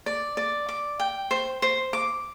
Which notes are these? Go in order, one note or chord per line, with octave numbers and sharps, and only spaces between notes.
D5
D5
D6
G5
C5
C5
D6